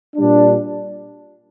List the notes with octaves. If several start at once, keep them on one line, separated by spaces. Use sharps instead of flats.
A#2 G3 D4